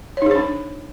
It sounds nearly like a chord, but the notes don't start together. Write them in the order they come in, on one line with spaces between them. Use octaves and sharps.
C#5 D#4 G#4 C5 D4